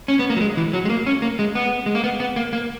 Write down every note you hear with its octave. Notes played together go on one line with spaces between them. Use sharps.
C#4
B3
A#3
F#3
G#3
E3
F#3
G#3
A#3
C#4
A#3
G#3
B3
G#3
A#3
B3
B3
A#3
A#3